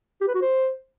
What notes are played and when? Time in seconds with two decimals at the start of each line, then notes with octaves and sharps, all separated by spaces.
0.21 G4
0.28 B4
0.35 F#4
0.41 C5